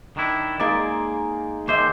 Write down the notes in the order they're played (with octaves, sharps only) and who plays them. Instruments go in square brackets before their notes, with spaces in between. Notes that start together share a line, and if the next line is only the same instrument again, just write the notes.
[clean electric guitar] D#3 D4 E4
[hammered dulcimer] G#3 D#4 G#4 [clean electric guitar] A#3 D5
[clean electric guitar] D#2 C5 [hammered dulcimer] D#5 E5 D6